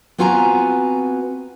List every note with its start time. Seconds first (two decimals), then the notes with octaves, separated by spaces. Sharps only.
0.18 B3 C4 F4 F#4 G#5 A#5